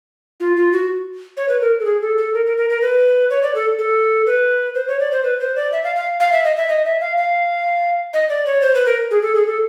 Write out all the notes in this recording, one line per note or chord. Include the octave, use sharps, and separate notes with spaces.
F4
F4
F#4
C#5
B4
A#4
A4
G#4
A4
A4
A#4
A#4
A#4
A#4
B4
C#5
D5
A4
A4
B4
C5
C#5
D5
C5
B4
C5
D5
E5
F5
F5
F5
E5
D#5
E5
D#5
E5
F5
F5
D#5
D5
C#5
C5
B4
A#4
G#4
A4
G#4
A4